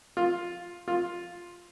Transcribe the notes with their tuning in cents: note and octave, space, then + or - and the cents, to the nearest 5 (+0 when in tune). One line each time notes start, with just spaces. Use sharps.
F4 +5
F4 +5